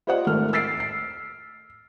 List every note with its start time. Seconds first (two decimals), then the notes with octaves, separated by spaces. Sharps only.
0.07 F4 G4 C5 D5 D#5 F#5
0.27 G#1 D#3 A3 F6
0.53 E6 A6 B6 C7 D7
0.80 C7